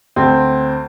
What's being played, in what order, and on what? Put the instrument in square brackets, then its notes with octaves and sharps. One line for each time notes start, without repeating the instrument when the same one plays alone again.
[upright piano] D2 C4